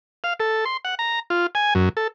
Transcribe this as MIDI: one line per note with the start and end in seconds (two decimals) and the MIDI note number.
0.24 0.33 77
0.40 0.65 69
0.65 0.77 84
0.85 0.95 78
0.99 1.20 82
1.30 1.47 65
1.55 1.74 80
1.75 1.89 42
1.97 2.08 69